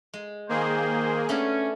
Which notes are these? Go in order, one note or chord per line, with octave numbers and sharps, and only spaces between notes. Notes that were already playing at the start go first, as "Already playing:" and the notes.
G#3
D#3 A#3 G#4 C5
A3 B3 C#4 D4